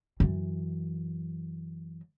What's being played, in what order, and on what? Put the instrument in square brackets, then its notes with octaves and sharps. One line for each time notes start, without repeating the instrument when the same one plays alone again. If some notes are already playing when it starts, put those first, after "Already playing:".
[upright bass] F#2 E3